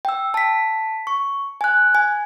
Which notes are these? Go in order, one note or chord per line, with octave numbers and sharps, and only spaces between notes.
G5 E6
A5 B6
C#6
G#5 F#6
G#5